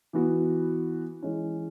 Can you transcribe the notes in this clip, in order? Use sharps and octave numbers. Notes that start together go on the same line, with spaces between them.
E3 B3 F#4
E3 G#3 C#4